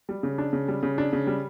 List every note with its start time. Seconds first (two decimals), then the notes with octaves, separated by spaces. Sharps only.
0.09 G3
0.23 C#3
0.38 D4
0.53 C#3
0.68 G3
0.83 C#3
0.98 D4
1.13 C#3
1.27 G3